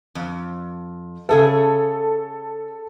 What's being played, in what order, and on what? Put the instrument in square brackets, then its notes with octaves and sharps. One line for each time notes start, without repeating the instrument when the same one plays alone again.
[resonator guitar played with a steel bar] F2
[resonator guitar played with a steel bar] C#3 G#4 E5 [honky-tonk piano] A4